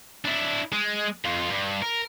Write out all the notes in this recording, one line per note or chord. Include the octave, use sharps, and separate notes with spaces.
D4 E4
G#3
F2 F4
G2
A#4